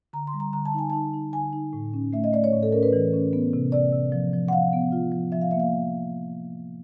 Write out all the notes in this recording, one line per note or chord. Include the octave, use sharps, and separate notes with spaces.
D3 A#5
C6
G3
A#5
D3 A#5
A5
D#4 G#5
D#4 A5
D#4
D3 G#5
D#4
A2
C#4
A3 E5
D#5
A3 D5
C#5
A2
A4
C#4 A#4
B4
E3
C#4
B3
C3
C3 D5
C3
F3
F3
F#5
F3 F5
B3
F4
F3
F3 E5
F5
A#3 E5
F5